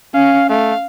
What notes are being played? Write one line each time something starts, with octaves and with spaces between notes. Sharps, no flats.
C#4 F5
A3 F5